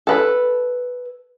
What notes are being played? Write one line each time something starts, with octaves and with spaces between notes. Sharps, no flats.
A4 B4